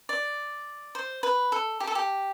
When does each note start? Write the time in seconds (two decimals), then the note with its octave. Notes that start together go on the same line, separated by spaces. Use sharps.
0.09 D5
0.95 C5
1.23 B4
1.52 A4
1.80 G4
1.87 A4
1.95 G4